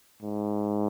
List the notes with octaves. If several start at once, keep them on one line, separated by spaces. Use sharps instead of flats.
G#2